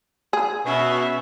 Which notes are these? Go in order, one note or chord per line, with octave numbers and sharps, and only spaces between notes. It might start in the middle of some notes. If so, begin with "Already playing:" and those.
G#4
B2 C#4 E5